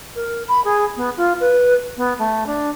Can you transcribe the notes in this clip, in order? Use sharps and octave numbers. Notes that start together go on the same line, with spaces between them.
A#4
B5
G#4
B3
F4
B4
B3
A3
D4